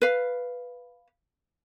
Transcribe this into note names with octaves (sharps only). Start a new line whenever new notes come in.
B4 F5